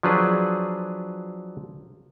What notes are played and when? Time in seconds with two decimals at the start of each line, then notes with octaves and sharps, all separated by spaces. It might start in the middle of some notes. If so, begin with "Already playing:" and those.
0.03 F3 F#3 D4 G#4 B4